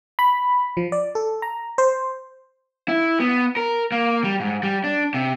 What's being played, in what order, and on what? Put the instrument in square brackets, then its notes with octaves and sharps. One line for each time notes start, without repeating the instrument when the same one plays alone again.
[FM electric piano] B5
F3
D5
A4
A#5
C5
[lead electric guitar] E4
B3
A#4
A#3
G3
G#2
G3
D4
C3